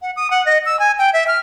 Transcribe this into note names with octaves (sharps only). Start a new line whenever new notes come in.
F#5
D#6
F#5
D#5
E6
G#5
G5
E5
F6